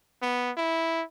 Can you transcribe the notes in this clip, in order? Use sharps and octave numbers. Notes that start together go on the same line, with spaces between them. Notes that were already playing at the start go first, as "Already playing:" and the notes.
B3
E4